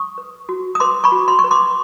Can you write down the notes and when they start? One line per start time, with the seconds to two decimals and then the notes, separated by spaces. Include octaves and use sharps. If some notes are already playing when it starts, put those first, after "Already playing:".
Already playing: C#6 D#6
0.18 B4
0.49 F#4
0.75 D#6
0.80 B4 C6 D6
1.04 B5 C#6
1.12 F#4
1.28 C6
1.39 C#6
1.44 B4
1.51 C6 D6